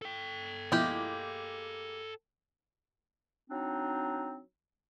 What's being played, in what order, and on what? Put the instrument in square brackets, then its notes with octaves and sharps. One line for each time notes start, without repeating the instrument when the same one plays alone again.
[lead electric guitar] A4 G5
[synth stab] B2 F3 E4 [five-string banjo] G#3 A#3 G4
[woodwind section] F#3 C4 D4 D#4